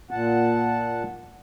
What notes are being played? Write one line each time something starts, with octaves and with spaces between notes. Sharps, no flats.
A#2 F#5 A5